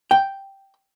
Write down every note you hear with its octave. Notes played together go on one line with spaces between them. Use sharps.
G5